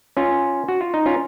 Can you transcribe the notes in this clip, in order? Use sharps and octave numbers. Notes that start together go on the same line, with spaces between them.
C#4 F4
F#4
F4
D#4
C#4 F4